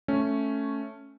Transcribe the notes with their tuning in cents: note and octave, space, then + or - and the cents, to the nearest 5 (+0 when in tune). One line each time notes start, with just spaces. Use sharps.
A3 +0 C#4 +0